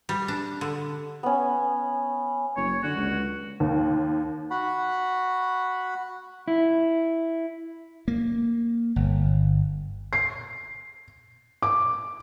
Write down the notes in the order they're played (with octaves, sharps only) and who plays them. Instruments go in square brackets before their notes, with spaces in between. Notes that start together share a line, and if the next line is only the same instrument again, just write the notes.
[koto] G3
D4
D3
[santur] B3 C#4
[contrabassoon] F#1 [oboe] C#5
[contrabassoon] D3 [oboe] F#4
[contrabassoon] C#2
[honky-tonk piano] D#2
[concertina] F#4 F#5 B5
[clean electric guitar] E4
[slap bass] A#3
G1
[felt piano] C7
D6